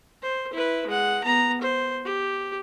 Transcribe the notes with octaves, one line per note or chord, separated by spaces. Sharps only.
C5
E4 B4
G#3 F#5
B3 A#5
C5
G4